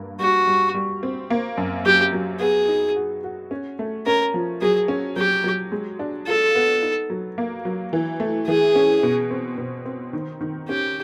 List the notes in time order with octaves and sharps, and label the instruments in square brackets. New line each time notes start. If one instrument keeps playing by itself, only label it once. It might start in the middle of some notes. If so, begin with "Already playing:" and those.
Already playing: [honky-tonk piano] G2 A#3
[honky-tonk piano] G3 [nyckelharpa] F#4
[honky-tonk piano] G3
G3
C4
A#3
F#2
[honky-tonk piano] F#3 [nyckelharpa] G4
[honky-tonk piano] F#3
[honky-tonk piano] B3 [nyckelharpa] G#4
[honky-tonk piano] D#4
F#4
F#4
C#4
A3
[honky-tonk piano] C#4 [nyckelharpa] A#4
[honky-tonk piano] F3
[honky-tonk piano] F#3 [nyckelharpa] G#4
[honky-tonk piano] C#4
[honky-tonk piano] F#3 [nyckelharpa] G4
[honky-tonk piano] F#3
G#3
D4
[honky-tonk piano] F4 [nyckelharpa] A4
[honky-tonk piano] B3
D#4
F#3
A#3
F#3
E3
A3
[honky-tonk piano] E3 [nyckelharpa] G#4
[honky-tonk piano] C#4
B2
C4
B2
C4
D#3
D#3
[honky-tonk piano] C#4 [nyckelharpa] G4